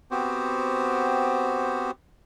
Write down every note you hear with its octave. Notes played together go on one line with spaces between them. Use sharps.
B3 C4 F#4 G4 C5